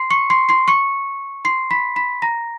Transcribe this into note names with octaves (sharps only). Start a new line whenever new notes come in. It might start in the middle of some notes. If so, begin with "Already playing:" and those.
Already playing: C6 C7
C#6 C#7
C6 C7
C6 C7
C#6 C#7
C6 C7
B5 B6
B5 B6
A#5 A#6